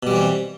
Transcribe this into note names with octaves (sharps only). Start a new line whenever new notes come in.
B2 E3 G3 C4